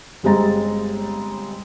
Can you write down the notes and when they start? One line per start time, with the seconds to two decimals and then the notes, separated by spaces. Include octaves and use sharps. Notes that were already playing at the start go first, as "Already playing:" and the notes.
0.23 G1 G3 G#3 C4 A#5 A6